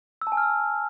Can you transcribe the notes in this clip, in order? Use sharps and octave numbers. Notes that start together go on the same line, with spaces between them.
E6
A5
G#5
F6
E6